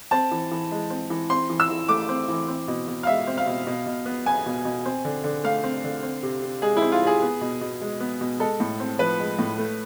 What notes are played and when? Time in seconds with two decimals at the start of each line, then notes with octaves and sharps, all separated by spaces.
0.11 C4 A5
0.31 E3
0.51 E3
0.71 G#3
0.90 C4
1.10 E3
1.30 C4 C6
1.50 E3
1.60 E6
1.69 E3
1.88 A3 D6
2.09 C4
2.28 E3
2.48 C4
2.68 B2
2.88 B2
3.03 F5
3.07 G#3 E5
3.27 C4
3.37 F5
3.47 B2
3.67 B2
3.87 B2
4.05 B3
4.26 B3 G#5
4.46 B2
4.65 B2
4.85 C4
5.05 D3
5.24 D3
5.44 A3 F5
5.64 C4
5.84 D3
6.03 C4
6.23 C3
6.42 C3
6.62 G#3 G#4
6.77 E4
6.82 C4
6.92 F4
7.02 C3 G#4
7.22 B3
7.41 B2
7.61 B2
7.81 G#3
8.00 B3
8.21 B2
8.39 G#3 A4
8.60 A2
8.80 C4
8.99 F3 B4
9.19 G#3
9.39 A2
9.58 A3